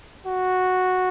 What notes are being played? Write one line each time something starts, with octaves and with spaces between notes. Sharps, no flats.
F#4